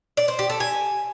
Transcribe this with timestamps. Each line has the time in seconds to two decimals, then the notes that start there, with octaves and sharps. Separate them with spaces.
0.17 D5
0.28 C5
0.39 G4
0.50 A4
0.60 G#5